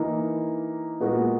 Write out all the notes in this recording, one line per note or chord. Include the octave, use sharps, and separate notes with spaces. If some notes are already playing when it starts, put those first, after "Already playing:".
Already playing: E3 A#3 D#4
A#2 G#3 B3 F#4 A#4